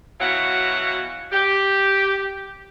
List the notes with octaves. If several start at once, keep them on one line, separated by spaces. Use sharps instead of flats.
B2 E3 F#3 F#4 F5 F#5
G4